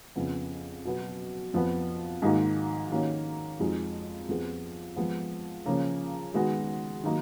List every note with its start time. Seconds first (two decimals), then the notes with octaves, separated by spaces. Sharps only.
0.16 F2 C#3 F3 B3
0.85 B2 F#3 B3
1.54 F2 F3 B3
2.22 G#2 D#3 A#3 D#4 F#4
2.91 D#3 A#3 C#4 F#4
3.60 F2 F3 G#3 D#4 F#4
4.28 F2 F3 B3 F4 G#4
4.96 F3 G#3 B3
5.66 C#3 F3 A#3 C#4
6.34 D#3 G#3 B3 F#4
7.03 D#3 F#3 A#3 D#4